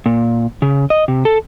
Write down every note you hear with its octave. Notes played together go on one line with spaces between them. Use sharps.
A#2
C#3
D#5
C3
A4